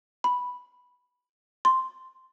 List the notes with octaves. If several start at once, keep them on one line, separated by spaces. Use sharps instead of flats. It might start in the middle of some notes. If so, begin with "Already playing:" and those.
B5
C6